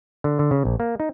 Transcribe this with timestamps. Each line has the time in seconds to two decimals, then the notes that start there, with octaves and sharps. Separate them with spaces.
0.24 D3
0.39 D3
0.51 C#3
0.65 A#1
0.80 A#3
1.00 D#4